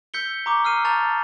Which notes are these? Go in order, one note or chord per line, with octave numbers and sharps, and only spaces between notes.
E6 G6 B6 C#7 G7
A#5 C#6 D6
E6 F6 C7 D#7
A5 A#5 C#6 G6 A6 F7